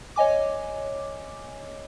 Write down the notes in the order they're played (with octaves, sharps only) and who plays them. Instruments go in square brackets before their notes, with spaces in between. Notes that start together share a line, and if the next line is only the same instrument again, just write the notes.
[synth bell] C#5 D#5 G#5 D6